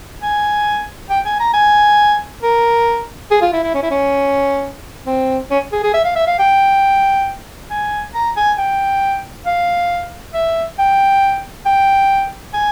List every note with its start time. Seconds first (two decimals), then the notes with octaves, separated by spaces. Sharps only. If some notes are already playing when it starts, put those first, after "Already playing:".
0.22 G#5
1.10 G5
1.26 G#5
1.40 A#5
1.54 G#5
2.43 A#4
3.31 G#4
3.42 F4
3.53 E4
3.63 E4
3.74 C#4
3.83 E4
3.91 C#4
5.07 C4
5.51 C#4
5.73 G#4
5.84 G#4
5.94 E5
6.05 F5
6.16 E5
6.27 F5
6.39 G5
7.71 G#5
8.15 A#5
8.37 G#5
8.58 G5
9.46 F5
10.34 E5
10.79 G5
11.66 G5
12.54 G#5